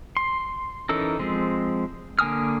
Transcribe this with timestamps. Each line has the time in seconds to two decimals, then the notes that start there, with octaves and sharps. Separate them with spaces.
0.17 C6
0.89 E3 C#4 D#4 A4 A#4
1.19 F3 G#3 C4
2.19 D3 A#3 G#5 D#6 F6